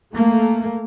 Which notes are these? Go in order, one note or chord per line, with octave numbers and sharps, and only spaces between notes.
A3 A#3